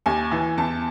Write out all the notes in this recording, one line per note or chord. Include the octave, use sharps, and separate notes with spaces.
D#2 G#5
E3
E2 A5